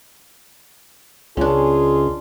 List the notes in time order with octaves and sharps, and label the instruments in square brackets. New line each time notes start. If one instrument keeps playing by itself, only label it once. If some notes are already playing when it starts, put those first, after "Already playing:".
[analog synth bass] C#2 [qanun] C#4 D4 [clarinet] F4 [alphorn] G#4